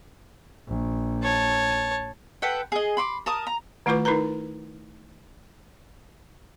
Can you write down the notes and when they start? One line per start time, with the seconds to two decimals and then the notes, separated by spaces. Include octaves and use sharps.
0.69 A#1
1.23 C#5 A5
2.42 A4 B4 F#5 G5
2.72 G#4 D#5
2.97 B5 C6 D6
3.26 A#4 A5 D#6
3.47 A#5
3.86 D#3 A3 E4 F4 B4 D6
4.05 D#4 E4 A#4 B4 A#5